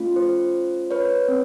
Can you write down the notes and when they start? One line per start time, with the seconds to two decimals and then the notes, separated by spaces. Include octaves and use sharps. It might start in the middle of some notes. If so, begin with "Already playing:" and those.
Already playing: A3 C#4 F4
0.16 C5
0.91 B4 C#5
1.28 C4